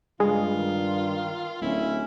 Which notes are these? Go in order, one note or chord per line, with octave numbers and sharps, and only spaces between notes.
G2 C#3 G#3 F4
D#3
D1 C#4 E4